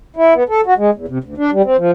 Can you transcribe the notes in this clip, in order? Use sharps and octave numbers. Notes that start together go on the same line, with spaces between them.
E4
B3
A4
F#4
G#3
E2
C3
D2
D4
G3
C4
F3